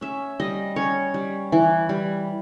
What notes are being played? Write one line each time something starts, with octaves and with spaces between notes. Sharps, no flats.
C#4 E5
G3 D#5
C#4 C#5
G3
E3
G3